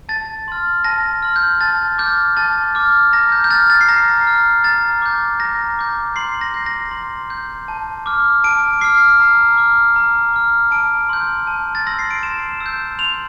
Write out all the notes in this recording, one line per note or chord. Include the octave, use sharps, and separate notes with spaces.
A5 A6
C6 F6
A5 A#6
C6 F6
G6
A5 A6
D6 F6 G6
A5 A6
D6 F6
A#5 A#6
G6
G6
F6 A6
A6
C7
A#5 A#6
F6
A#5 A6
D6 G6
A#5 A#6
D6 G6
C6 C7
A#6
G6
A#6
C6
G6
A5
D6 F6
A5 D7
D6 F6 C7
A#5
D6 F6
A#5
D6 F6
A5 D7
C6 E6 G6
A5
A6
C6 E6 G6 A#6
C7
D7
C6 E7
E6
G6
C6 F7